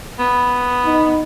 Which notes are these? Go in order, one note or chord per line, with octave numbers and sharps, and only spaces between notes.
B3
D#4